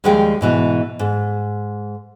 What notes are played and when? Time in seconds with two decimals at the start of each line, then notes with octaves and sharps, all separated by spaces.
0.04 D#2 F3 G3 G#3 G#4 G5
0.41 G#2 B2 E3
0.99 G#2